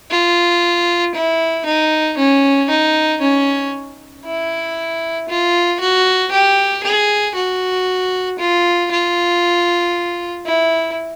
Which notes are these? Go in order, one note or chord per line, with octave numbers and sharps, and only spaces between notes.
F4
E4
D#4
C#4
D#4
C#4
E4
F4
F#4
G4
G#4
F#4
F4
F4
E4